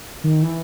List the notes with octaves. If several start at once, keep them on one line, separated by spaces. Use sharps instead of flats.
D#3
E3